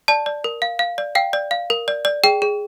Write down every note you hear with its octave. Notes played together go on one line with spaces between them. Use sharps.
D5 A5
D5
A#4
F5
F5
D5
F5 G5
D5
F5
A#4
D5
D5
G#4 G5
G#4